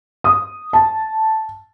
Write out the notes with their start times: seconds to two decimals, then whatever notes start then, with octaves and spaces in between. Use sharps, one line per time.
0.24 D#6
0.73 A5